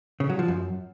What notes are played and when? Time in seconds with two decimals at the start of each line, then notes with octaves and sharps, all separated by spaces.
0.20 C#3
0.30 F#3
0.39 F3
0.48 F#2